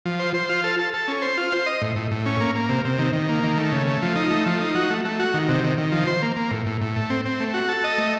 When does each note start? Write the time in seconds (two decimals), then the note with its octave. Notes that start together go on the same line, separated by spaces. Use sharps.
0.05 F3
0.19 C5
0.34 C5
0.49 F4
0.64 A4
0.79 A4
0.94 A4
1.08 C#4
1.22 C5
1.37 F4
1.52 C5
1.66 D#5
1.82 A2
1.96 A2
2.11 A2
2.26 C#4
2.40 A#3
2.55 A#3
2.69 C3
2.85 C3
2.98 D#3
3.13 D#3
3.29 A#3
3.43 D#3
3.57 A3
3.72 C#3
3.87 A3
4.02 F3
4.16 D#4
4.30 A3
4.46 F3
4.61 D#4
4.75 F#4
4.90 A3
5.05 A3
5.20 F#4
5.34 D#3
5.49 C3
5.64 D#3
5.78 D#3
5.92 F3
6.07 C5
6.22 A#3
6.36 A#3
6.51 A2
6.66 A2
6.81 A2
6.96 A3
7.10 C4
7.25 C4
7.40 A3
7.54 F#4
7.69 A4
7.84 D#5
7.98 A3